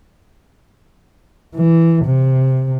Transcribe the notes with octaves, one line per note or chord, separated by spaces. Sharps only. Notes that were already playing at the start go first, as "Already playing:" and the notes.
E3
C3